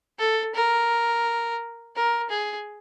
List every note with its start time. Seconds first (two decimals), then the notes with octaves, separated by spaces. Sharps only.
0.19 A4
0.54 A#4
1.96 A#4
2.30 G#4